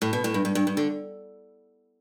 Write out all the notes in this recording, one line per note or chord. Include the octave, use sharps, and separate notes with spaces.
A2
B2
A2
G2
G2
G2
G2
D3